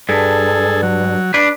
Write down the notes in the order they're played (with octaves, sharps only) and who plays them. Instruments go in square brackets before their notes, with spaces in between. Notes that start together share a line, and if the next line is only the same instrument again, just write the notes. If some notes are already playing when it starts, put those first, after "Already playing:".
[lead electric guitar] G2 [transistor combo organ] G#4 A4
[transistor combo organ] F#3
[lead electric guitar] D4 B4